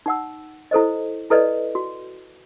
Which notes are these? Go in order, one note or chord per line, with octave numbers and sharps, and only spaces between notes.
D#4 F#5 E6
E4 A4 C5 D#5
E4 A4 B4 D5 D#5
F#4